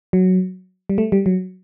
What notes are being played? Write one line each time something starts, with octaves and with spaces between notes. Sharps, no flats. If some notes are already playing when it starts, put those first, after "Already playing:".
F#3
G3
A3
G3
F#3